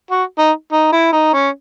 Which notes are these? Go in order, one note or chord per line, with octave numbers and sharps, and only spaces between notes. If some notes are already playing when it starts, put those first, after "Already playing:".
F#4
D#4
D#4
E4
D#4
C#4